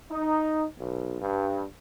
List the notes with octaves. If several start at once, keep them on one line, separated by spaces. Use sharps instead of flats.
D#4
B1
G2